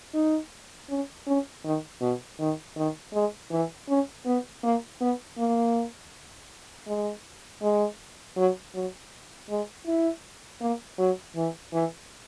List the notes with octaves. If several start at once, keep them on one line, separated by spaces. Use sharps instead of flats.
D#4
C#4
C#4
D#3
B2
D#3
D#3
G#3
E3
C#4
B3
A#3
B3
A#3
G#3
G#3
F#3
F#3
G#3
E4
A#3
F#3
E3
E3